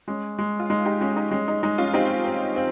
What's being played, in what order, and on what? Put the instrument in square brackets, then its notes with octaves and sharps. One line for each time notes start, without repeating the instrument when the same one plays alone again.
[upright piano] G#3 [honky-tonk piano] C#4
[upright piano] G#3
[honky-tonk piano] F4
[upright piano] G#3 [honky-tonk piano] D#4
[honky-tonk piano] D#4 G4
[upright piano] G#3 [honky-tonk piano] C#4
[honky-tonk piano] D#4
[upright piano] G#3 [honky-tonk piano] C#4
[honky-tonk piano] D#4
[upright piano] G#3 [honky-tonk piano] D#4
[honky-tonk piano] C#4 F4
[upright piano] C4 [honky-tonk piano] D#4 G4
[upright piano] C4
C4